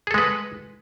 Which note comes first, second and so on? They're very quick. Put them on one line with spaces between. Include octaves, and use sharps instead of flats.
G#4 A4 G#3 B4